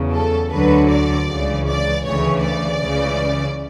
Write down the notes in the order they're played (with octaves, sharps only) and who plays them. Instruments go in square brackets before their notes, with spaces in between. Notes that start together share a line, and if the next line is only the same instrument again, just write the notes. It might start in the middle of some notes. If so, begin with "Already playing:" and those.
Already playing: [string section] E2 C#3 F#3
A4
D2 D3 F#3 B4
D5
C#2 C#3 E3
D5
D2 C#3 E3 C#5
D5
C#2 C#3 E3